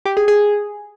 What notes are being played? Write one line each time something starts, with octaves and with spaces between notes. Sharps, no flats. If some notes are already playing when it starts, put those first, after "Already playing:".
G4
G#4
G#4